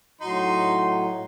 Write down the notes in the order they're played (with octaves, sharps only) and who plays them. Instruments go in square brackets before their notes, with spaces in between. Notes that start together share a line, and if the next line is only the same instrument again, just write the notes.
[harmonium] A2 F#3 [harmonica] D#4 C6